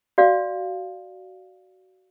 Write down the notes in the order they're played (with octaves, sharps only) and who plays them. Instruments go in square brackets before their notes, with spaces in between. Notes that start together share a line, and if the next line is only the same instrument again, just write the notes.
[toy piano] F#4 D5 F5